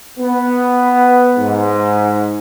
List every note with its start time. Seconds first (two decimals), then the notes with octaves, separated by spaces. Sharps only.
0.19 B3
1.37 G#2